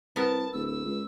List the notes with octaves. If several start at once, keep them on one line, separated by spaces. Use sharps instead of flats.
C2 B3 A#4 A5
D1 E6
E6
C#2